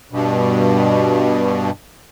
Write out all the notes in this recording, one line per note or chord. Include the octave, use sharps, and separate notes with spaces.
G2 B2